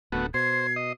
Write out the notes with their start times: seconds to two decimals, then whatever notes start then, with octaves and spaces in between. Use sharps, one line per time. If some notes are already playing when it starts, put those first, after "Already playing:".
0.12 D1 D3 A3 B3 F#4
0.34 B2 C5 G#6 C7
0.76 D#5